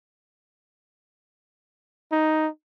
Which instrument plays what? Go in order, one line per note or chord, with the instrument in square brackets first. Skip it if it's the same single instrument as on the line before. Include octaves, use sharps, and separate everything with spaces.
[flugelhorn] D#4